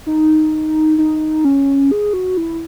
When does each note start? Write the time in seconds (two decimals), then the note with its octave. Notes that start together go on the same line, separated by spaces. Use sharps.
0.06 D#4
0.98 D#4
1.45 C#4
1.91 G#4
2.13 F#4
2.37 E4